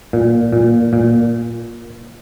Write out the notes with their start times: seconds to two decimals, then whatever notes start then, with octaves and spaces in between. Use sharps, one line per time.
0.13 A#2
0.52 A#2
0.93 A#2